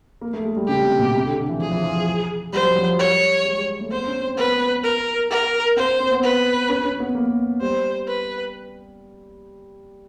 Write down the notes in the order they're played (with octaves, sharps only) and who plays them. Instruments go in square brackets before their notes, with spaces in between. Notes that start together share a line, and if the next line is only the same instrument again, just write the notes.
[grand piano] A#3
A3
G#3
G3
[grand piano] C#3 [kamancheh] G4
[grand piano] C3
B2
C3
D3
D3
E3
[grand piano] F3 [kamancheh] G#4
[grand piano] E3
F3
[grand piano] G3 [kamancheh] C5
[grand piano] F#3
F3
F#3
[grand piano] G3 [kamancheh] C#5
[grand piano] G#3
G#3
A3
[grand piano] B3 [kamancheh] C5
[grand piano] C#4
C4
[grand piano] B3 [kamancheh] B4
[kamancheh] A#4
A#4
[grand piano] C4 [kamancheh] C5
[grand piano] C4
B3
[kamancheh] B4
[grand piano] C#4
C#4
B3
A#3
[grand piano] G3 [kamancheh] C5
[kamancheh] B4